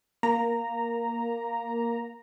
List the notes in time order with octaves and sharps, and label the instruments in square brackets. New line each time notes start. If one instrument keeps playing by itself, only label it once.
[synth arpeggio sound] A#3 A#5